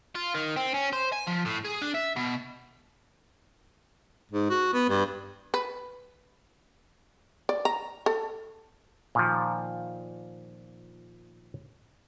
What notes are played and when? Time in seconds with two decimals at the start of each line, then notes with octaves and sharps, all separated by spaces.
0.15 F4
0.34 D#3
0.56 C4
0.74 C#4
0.93 C5
1.12 G#5
1.27 F3
1.45 A2
1.65 G#4
1.82 D4
1.95 E5
2.16 B2
4.32 G#2
4.50 F#4
4.73 B3
4.89 G2
5.54 B4
7.49 D5
7.65 A#5
8.06 A4
9.15 A#2 D#3 F3